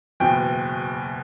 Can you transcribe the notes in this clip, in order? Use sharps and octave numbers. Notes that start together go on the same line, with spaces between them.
F#1 E2 B2 G5